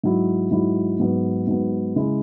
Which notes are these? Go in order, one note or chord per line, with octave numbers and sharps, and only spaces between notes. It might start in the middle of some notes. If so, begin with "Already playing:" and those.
G#2 F#3 E4
G#2 F#3 E4
G#2 F#3 B3
G#2 F#3 B3
C#3 G#3 E4 G#4